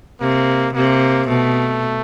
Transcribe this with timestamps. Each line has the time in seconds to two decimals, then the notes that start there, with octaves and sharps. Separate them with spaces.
0.21 C3 A#3
0.75 C3 A#3
1.28 B2 A3